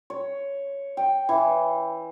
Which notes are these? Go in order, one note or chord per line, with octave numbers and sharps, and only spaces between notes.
C#5
G5
E3